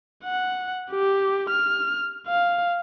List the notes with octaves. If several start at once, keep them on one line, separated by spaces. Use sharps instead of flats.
F#5
G4
F6
F5